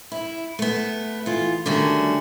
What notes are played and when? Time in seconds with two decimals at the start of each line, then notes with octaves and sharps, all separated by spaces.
0.12 E4
0.59 A3 B3
1.26 E2 F4
1.66 D3 D#3 G3 A3 C#4 F#4